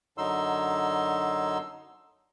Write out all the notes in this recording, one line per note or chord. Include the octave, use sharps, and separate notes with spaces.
F#2 D3 F#3 D#4 C6 E6